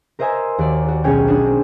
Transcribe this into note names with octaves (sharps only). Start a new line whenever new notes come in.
A#4 C5 D#5 E5 G#5 A#5
D#2 F#4 D5
F#4
B1 C#4 G#4 C#5 G5 G#5
D4 C#5 D#5
C4